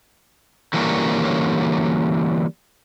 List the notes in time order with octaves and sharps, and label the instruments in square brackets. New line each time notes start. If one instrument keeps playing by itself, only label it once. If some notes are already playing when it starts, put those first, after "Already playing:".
[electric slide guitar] D3 E3 F#3 G3 A#3 C#4